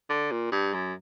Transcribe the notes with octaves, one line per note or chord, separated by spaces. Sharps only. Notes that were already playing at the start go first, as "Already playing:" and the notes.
D3
A#2
G2
F#2